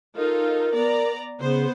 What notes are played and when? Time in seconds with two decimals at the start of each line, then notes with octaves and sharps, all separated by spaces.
0.17 D#4 F4 A4 A#4
0.73 B3 D5 A#5
1.40 C#3 B3 C5